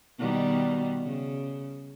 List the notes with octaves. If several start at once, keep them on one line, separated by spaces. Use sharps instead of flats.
B2 D#3 G3
C#3